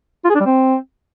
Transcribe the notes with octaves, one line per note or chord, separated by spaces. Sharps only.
F4
G#4
D4
G3
C4